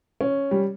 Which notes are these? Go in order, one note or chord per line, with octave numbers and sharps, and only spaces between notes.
C#4
G3